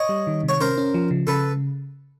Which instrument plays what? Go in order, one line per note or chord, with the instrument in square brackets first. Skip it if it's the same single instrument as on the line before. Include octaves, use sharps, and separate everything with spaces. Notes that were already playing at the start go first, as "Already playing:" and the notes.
Already playing: [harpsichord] C#5 D#5
[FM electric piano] G3
D#3
C3
[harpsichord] C#5
[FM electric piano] C#4 [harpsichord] A#4 C5
[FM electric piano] C#4
F3
C#3
[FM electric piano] C#3 [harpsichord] A4 B4